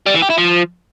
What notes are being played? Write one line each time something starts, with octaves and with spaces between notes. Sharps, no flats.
G3
E3
G4
E4
F3